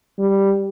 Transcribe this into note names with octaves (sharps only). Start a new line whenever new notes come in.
G3